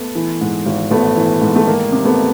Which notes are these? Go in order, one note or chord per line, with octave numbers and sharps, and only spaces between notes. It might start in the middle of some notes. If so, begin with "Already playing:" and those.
Already playing: A3 B3
E3
G#2
G#1
G#1 A3 B3
E3
G#2
A3
D#3 A#3
C3
A3 B3